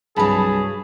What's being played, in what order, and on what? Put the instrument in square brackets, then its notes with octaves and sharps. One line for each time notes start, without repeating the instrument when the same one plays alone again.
[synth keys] C2 A5 B5 [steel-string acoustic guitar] G2 F#3 [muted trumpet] G#4